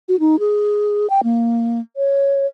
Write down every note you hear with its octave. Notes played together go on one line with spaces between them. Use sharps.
F#4
D#4
G#4
G5
A#3
C#5